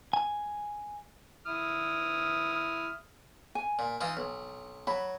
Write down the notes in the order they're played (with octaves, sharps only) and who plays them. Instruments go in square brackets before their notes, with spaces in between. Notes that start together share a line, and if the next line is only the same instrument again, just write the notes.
[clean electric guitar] G#5
[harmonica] E4 D#6 F6
[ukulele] G#5
[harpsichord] A#2
E3 D#4 F4
B1
[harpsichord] F#3 [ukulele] B5